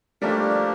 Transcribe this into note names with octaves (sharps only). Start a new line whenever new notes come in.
F3 G3 A3 A#3 D4 G4 A#4